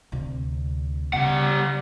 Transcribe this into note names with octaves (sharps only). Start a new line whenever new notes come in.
D2 C3
C#3 G3 B3 F#5